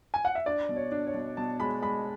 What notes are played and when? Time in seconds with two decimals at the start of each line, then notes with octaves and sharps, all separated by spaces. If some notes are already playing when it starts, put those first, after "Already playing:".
0.14 G#5
0.25 F#5
0.35 E5
0.46 D4 D5
0.69 B2
0.76 C#5
0.92 D4
1.07 C#5
1.14 B2
1.37 B2 A5
1.60 G#3 B5
1.82 G#3 B5